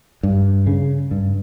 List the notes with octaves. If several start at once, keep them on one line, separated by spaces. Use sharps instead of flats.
G2
C#3
G2